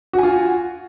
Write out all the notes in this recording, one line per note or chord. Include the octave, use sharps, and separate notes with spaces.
F4 F#4 G#5